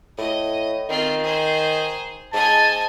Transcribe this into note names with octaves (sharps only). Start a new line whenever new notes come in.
A2 D#5
D#3 C4 F4
G#4 C5
G#2 D#5 G#5 A5